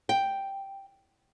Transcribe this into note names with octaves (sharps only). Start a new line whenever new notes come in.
G5